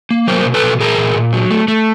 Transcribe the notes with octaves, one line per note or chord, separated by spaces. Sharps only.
A#3
F#3 A#4 C5
B2
A4 B4
B2
A#2 G#4 A#4
A#2
A#2
F#3
A3
A3